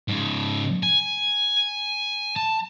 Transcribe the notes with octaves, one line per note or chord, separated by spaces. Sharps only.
G#2 C#3
G#5
A5